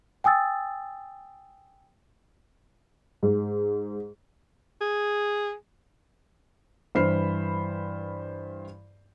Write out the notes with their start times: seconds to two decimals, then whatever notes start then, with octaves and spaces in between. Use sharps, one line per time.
0.24 G5 G#5 D#6 E6 A6
3.23 G#2
4.81 G#4
6.95 G2 E3 C5 B5 F6 C7